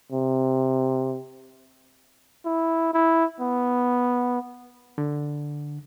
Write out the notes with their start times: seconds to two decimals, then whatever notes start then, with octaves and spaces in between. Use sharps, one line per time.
0.12 C3
2.45 E4
2.94 E4
3.41 B3
4.98 D3